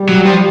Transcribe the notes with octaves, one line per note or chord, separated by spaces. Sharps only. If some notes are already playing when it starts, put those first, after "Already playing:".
Already playing: G3
F#3
F3